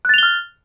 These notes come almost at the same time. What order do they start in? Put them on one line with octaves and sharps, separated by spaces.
F#6 A6 F7 G7 F6